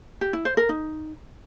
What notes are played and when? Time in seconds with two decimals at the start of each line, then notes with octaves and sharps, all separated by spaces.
0.21 G4
0.33 E4
0.45 C5
0.57 A#4
0.69 D#4